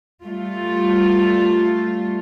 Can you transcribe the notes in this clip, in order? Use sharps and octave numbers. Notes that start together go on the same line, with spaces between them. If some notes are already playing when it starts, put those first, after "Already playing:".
G3 A3 F4